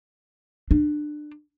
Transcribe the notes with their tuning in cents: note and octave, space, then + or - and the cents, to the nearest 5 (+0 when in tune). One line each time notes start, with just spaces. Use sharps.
D4 +25